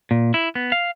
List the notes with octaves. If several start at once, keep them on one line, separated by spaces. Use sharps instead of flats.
A#2
E4
B3
F5